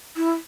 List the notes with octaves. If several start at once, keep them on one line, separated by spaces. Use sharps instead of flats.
E4